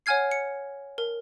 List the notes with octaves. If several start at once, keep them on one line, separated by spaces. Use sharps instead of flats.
C#5 F#5 G#5 F6 G#6 C7
C#7
A#4